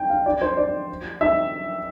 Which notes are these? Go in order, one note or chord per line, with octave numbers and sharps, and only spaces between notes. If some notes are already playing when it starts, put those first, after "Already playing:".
Already playing: G5
F5
D5
C5
D5
E5